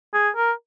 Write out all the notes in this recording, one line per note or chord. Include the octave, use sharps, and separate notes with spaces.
G#4
A#4